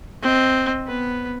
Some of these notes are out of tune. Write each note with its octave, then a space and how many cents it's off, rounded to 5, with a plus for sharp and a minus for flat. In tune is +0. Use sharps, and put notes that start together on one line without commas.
C4 +0 D#5 +0
B3 +0 B4 +0